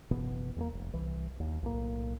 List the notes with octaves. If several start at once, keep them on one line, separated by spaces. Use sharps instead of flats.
F#1 B2 E3 B3
E2 G#3 A#3
F1
C2 E3
D#2
B1 A2 A#3